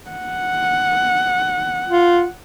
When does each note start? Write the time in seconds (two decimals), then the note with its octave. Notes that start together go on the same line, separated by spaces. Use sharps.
0.11 F#5
1.87 F4